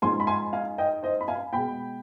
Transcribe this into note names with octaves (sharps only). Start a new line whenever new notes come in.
G#2 F3 G#3 G#5 C6
B5
G#5 C6
F5 G#5
D#5 G5
C5 D#5
B5
F5 G#5
B2 G#3 G5 B5